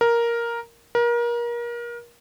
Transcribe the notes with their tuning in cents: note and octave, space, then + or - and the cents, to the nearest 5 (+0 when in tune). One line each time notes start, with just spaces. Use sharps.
A#4 +5
A#4 +30